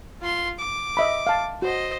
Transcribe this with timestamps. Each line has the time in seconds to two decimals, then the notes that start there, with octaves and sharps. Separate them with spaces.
0.22 F4 C6
0.59 D6
0.97 D#5 E5 B5
1.27 F5 A5
1.62 F#4 C5 D#5